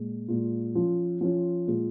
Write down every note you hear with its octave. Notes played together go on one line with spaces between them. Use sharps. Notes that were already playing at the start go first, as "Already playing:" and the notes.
Already playing: A#2 G#3
A#2 G#3 F4
F3 C#4 F4
F3 C#4 F4
A#2 G#3 F4 G#4